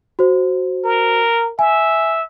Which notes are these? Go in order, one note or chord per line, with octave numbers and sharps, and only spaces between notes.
F#4 C5
A#4
E5 G#5